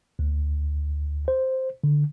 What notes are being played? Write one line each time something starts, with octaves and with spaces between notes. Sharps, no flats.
D2
C5
D3